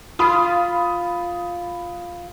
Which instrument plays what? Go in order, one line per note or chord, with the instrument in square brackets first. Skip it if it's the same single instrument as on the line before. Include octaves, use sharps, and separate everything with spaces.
[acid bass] F4 [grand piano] B5 D#6